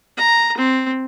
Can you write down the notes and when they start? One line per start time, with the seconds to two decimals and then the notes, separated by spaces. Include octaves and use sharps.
0.17 A#5
0.57 C4